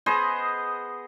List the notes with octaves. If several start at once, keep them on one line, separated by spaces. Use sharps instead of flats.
B3 G#4 C5 D#5